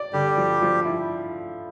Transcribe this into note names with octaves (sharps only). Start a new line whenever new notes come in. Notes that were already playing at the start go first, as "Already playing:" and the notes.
Already playing: D5
D3 G3 G4
F3
F3
E4